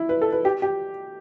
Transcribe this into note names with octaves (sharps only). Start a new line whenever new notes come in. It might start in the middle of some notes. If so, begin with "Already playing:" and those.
Already playing: E4
B4
A4
B4
G4
G4